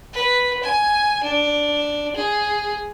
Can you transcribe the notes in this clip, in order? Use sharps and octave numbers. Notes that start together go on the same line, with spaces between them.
B4
G#5
D4
G#4